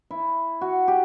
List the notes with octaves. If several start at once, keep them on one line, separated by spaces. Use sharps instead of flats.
E4
F#4
G4